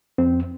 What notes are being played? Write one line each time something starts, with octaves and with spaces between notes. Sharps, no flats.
F2 C4